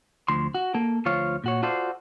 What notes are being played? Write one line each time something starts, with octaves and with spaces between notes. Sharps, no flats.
D2 F3 C6
F#4
A#3 A4
D2 F3 F4 C#5 F5
A#2 F#4 C#5
F4 F#4 A4 C5 D5 F5